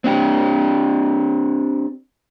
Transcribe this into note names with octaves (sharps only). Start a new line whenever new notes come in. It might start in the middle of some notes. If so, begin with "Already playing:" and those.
C4 D4 G4